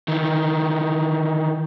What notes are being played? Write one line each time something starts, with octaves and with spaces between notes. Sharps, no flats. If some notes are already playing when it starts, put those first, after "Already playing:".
D#3 E3